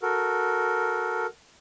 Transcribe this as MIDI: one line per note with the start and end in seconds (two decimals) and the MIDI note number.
0.02 1.26 66
0.02 1.26 69
0.02 1.26 70